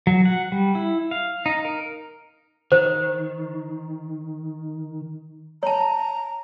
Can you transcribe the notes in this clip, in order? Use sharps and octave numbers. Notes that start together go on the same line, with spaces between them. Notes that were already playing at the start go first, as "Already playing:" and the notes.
F#3
F#5
G3
E4
F5
D#4
A#4
D#3 C5
C#5 A5 A#5